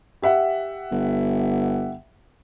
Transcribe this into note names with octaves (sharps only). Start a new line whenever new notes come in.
G4 E5 F#5
G1